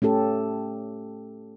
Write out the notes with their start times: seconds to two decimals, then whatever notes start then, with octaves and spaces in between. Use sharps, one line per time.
0.02 A3 C#4 G4 A4